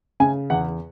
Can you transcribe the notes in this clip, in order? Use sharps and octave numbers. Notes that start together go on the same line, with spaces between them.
C#3 G#5
E2 F#5